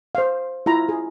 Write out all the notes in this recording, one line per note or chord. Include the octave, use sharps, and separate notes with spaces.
C5 F5
E4 F4 A#5
G#4